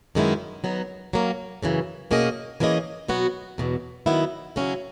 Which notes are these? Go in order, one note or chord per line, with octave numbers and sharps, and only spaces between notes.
F#2 D#3 G#3 B3 E4
F#3 B3 D#4
F#3 A#3 C#4
F#2 C#3 E3
B2 A#3 C#4 G#4 D#5
E3 A#3 C#4 G#4 D#5
B2 F#3 B3 F#4
E2 B2 F#3
D#3 F#3 B3 E4
C#3 F#3 C#4 E4